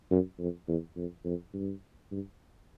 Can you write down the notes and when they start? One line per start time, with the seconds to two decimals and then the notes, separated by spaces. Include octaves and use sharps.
0.11 F#2
0.40 F2
0.68 E2
0.97 F2
1.25 F2
1.54 G2
2.12 G2